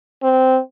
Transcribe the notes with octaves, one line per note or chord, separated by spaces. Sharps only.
C4